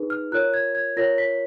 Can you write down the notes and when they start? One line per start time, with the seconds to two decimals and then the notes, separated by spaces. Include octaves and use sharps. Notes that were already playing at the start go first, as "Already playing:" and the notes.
Already playing: D#4 G#4 B4
0.10 F6
0.32 F4 A#4 C#5 F#6
0.54 G#6
0.75 G#6
0.97 F4 A#4 C#5 A#6
1.18 B6